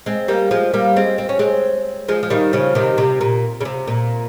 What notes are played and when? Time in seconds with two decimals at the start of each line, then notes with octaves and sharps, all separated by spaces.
0.06 G#3 C4
0.28 G3 A#3
0.51 F3 G#3
0.73 G3 A#3
0.96 G#3 C4
1.18 C4
1.29 C#4
1.39 G#3 C4
2.08 F3 G#3
2.23 F3
2.30 D#3 G3
2.53 C#3 F3
2.75 C3 D#3
2.98 C3
3.21 A#2
3.61 C#3
3.65 C3
3.87 A#2